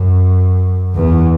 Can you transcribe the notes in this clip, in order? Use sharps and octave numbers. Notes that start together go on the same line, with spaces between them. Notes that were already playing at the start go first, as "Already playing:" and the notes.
Already playing: F#2
E2